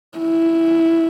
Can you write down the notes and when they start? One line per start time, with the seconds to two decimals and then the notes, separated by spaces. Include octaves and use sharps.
0.18 E4